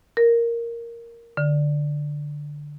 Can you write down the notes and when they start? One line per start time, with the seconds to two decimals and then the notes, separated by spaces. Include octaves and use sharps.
0.17 A#4
1.37 D3